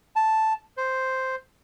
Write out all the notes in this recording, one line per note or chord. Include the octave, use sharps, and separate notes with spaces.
A5
C5